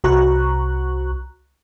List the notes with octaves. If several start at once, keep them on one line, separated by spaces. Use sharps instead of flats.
C2 F#4 A#5 C#6 F#6